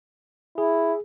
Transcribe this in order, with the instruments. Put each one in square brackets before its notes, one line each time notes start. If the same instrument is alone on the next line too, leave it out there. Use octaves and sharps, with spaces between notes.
[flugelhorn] E4 [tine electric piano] G#4